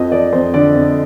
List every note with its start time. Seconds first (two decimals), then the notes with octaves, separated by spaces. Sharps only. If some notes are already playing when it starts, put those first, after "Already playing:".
Already playing: F2 F3 D#5
0.11 F3 D5
0.33 F2 C5
0.54 D3 D5
0.75 F2